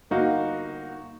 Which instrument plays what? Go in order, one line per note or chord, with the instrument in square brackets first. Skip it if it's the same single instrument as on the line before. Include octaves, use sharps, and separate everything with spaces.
[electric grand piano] G1 A#3 D#4 F#4 F5